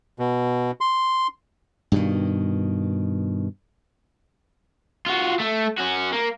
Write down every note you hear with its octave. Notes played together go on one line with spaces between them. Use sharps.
B2
C6
G2 B2 D#3
F4 F#4
A3
C#4 F#4
A#3